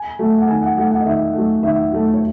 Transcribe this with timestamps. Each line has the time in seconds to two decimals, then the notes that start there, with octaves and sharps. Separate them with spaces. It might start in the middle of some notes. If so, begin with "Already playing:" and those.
Already playing: G#5
0.19 F#3 A3
0.38 F#5
0.48 D#3 G#5
0.62 F#5
0.77 F#3 A3 F#5
0.91 F#5
1.01 D#5
1.05 D#3 E5
1.35 F#3 A3
1.63 D#3 E5
1.92 F#3 A3
2.14 C#5